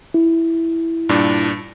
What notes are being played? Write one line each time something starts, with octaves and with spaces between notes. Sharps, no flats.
E4
G2 A#2 D4